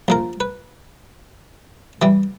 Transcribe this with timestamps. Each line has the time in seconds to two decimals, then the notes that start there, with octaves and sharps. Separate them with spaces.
0.08 A#1 F3 A#4
0.40 B4
2.02 E3 G3